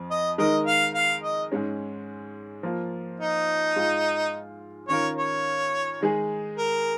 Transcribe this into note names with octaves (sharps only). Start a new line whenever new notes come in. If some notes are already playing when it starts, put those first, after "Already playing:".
Already playing: F2 F3
D#5
D#3 G#3 D#4 A#4 D#5
F5
F5
D#5
G#2 G#3 C#4
F3 A#3 F4
D#4
G#2 G#3 F4
D#3 C#4 F4 A#4 C#5
C#5
D#3 G#3 D#4 G#4
A#4